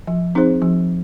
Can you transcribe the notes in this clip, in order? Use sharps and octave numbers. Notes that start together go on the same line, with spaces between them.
F3
C4 D#4 G#4 C5
F3